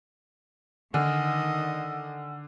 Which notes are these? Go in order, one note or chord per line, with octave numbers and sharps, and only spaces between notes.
D3 D#3 D#5 F#5 G#5 F6